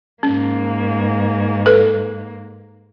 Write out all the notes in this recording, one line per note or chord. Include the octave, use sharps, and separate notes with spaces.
G#2 A#3 C#4
A4 B4